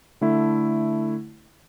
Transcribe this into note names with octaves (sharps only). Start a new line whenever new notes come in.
D3 A3 E4